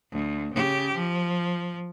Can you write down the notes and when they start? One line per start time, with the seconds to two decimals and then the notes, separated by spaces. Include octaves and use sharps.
0.12 D2
0.54 C#3 G4
0.95 F3